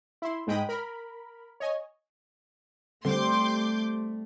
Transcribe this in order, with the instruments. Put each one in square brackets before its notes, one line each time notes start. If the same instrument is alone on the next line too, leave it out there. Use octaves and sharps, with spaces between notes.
[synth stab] E4 C6
G#2 G#3 G5 B5 D#6
A#4 B5
C#5 D#5 G#5
[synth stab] D3 [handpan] G3 C4 [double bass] A3 [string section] C6 D6 G6